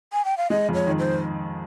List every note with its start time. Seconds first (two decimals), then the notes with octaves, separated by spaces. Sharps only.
0.13 G#5
0.25 G5
0.37 F5
0.50 G#3 D#5
0.69 F2
0.74 C#5
0.87 D#3
0.99 C5